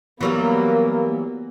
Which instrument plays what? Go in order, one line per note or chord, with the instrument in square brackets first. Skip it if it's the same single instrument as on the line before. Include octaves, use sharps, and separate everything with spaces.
[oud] E3 F#3 G3 [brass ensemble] A#3 [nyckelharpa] B3